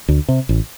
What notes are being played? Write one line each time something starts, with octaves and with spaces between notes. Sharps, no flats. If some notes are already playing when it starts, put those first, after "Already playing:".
D2
C3
A1